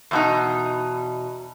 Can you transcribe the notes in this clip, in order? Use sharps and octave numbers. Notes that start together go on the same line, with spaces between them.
E2 B2 D#4